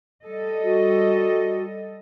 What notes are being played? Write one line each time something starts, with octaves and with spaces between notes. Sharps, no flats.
G3 A4 D#5
F#4